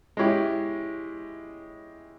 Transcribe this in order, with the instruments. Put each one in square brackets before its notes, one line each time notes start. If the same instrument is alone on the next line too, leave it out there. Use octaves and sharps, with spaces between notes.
[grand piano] G#3 C#4 E4 G4